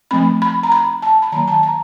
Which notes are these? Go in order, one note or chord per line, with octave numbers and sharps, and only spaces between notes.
F3 A3 C4 B5
B5
A#5
B5
A5
B5
D#3 F#3 A#3 A#5
A5
A#5